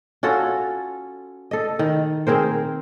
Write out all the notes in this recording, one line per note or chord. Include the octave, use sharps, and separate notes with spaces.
C#4 F4 F#4 A4
A4 D#5
D#3
C4 G#4 A#4 C5